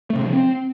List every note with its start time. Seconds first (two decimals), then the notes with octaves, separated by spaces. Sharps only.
0.10 A3
0.16 C3
0.21 D3
0.27 F3
0.32 C4